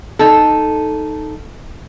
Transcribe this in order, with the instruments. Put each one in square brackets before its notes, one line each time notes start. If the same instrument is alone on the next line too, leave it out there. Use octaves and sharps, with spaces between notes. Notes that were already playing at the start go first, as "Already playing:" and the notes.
[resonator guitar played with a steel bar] D#4 A4